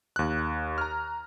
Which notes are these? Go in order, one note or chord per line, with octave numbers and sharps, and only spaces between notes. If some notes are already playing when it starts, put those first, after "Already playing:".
D#2 F#6
A#5 F6